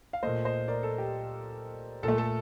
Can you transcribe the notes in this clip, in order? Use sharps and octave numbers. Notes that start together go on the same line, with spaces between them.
F5
A#2 A3 C5 D#5
C5 D#5
A#4 D5
A4
G4
A#2 A4
A3
A4